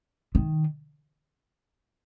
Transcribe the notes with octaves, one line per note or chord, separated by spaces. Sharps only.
D#3